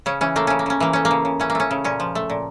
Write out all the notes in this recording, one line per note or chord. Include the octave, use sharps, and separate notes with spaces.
C#3 C#4
E3 C#4
A3 A#3
C#3 C#4
A#3
C#3 C#4
E3 A#3
A3 C#4
A#3
C#3
C#3
E3 C#4
A#3
A3 C#4
C#3
A#2 C#4
F3
A3
A#2